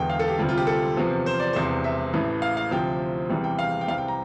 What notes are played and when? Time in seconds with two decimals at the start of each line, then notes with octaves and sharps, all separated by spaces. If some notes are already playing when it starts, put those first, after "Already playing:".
Already playing: E1 E2 D3 G5
0.10 F5
0.19 A4
0.28 G4
0.38 D2 C3 G3 F4
0.49 F4
0.58 G4
0.67 A4
0.97 E2 C3 F3
1.26 C5
1.40 D5
1.53 E1 E2 C3 C5
1.84 E5
2.14 A1 A2 E3
2.42 F5
2.57 F5
2.71 D2 C3 F3 G5
3.29 E1 E2 C3 E3 G3
3.44 G5
3.59 F5
3.81 G5
3.88 C2 C3 G3 F5
3.98 G5
4.08 A#5